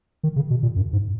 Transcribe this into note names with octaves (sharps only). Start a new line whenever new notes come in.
D#3
C#3
B2
A#2
F#2
G#2